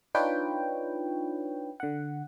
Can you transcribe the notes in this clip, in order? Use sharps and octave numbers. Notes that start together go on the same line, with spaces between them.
D4 D#4 F4 B4 C#5 G5
D3 F#5